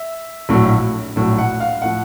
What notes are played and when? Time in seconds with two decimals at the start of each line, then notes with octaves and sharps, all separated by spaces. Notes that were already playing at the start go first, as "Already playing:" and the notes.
Already playing: E5
0.49 A#1 A2 F#3
1.16 A#1 A2 F#3
1.38 F#5
1.60 F5
1.82 A2 F3 F#5